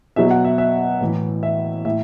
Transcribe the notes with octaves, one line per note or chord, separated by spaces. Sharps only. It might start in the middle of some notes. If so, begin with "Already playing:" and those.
B2 F#3 E5
F#5
E5
E5
A2 E3
E5
A2 E5